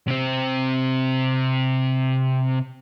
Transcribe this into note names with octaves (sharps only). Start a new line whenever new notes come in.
C3 C4